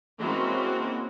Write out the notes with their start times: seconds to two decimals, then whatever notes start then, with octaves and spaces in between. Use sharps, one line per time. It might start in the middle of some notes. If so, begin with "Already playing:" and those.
0.19 E3 G#3 A#3 C4 C#4 F#4